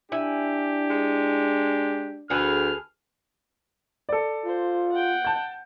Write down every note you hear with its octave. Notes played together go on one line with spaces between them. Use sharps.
D4 E4 G4 G#5
G#3
D2 G#4 A4 B4 F6
A4 D5
F4 C5
F#5 G5
A5 G6